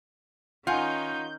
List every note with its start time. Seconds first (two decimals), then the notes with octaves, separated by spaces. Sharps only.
0.67 D#3 C#4 D#4 F4 F#5 G#5 F6 G6